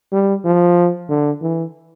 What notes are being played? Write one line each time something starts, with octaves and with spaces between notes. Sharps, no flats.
G3
F3
D3
E3